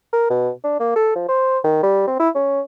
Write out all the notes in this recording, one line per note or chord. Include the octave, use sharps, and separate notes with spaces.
A#4
B2
D4
A#3
A4
F3
C5
D#3
G3
C4
E4
C#4